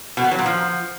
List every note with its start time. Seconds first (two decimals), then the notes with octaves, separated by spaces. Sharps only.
0.17 B2
0.24 B3
0.31 F#3
0.39 A#2
0.46 F3